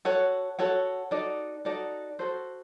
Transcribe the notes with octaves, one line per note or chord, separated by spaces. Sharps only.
F#4 A4 C#5 F#5
F#4 A4 C#5 F#5
D#4 F#4 A4 D5
D#4 F#4 A4 D5
F#4 A4 C5